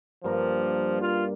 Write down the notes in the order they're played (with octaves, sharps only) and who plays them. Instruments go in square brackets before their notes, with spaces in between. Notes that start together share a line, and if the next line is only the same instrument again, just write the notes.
[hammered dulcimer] G2 A#3 A#4 [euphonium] F3
[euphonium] F4